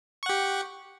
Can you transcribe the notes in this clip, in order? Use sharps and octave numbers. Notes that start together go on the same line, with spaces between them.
G4 F#5 C#6